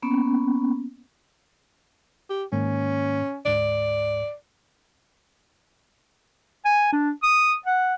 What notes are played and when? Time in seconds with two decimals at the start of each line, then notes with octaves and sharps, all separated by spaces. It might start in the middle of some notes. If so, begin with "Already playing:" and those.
0.02 A#3 B3 C#4
2.30 G4
2.52 G#2 D#3 A#3 C#4
3.45 D2 G#2 D5
6.65 G#5
6.92 D4
7.23 D#6
7.66 F#5